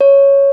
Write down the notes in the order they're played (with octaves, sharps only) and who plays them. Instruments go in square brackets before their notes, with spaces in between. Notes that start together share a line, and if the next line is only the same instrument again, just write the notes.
[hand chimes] C#5